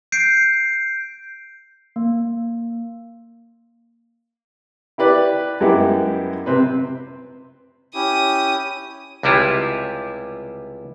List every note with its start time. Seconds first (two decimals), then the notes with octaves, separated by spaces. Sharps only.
0.12 G6 C7 D7
1.96 A#3
4.98 E4 G4 B4 D5
5.61 F#2 G3 G#3 B3 E4 G4
6.46 C3 C4 B4
7.94 C#4 E4 G4 D#6
9.23 C#2 C3 G3 E4 F4